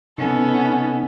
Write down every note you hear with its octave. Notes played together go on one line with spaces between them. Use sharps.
C3 B3 C#4 D#4 A4